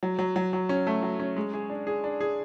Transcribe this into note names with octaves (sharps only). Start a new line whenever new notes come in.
F#3
F#3
F#3
F#3
C#4
A3
F#3
C#4
G#3
G#4
D4
G#4
D4
G#4